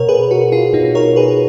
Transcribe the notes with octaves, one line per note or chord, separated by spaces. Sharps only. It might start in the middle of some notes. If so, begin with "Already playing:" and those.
Already playing: B2 A#4 C#5
G#4 B4
F#4 A#4
F4 G#4
B2 D#4
A#4 C#5
G#4 B4